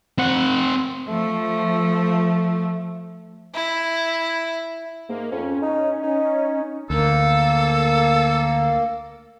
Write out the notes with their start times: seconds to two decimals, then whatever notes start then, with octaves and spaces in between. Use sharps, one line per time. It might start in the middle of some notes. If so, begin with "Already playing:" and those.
0.18 C4 F#5
1.09 F3 A3
3.54 E4
5.09 G#2 A#3
5.31 F2 C#4
5.62 D#4
6.03 D#4
6.90 D2 A#3 A4